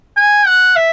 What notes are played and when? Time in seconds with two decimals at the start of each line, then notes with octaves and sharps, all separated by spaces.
0.17 G#5
0.47 F#5
0.76 E5